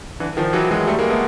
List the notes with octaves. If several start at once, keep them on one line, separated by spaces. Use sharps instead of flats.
D3 E3
D#3 F3
E3 F#3
F#3 G#3
G3 A3
G#3 A#3
A3 B3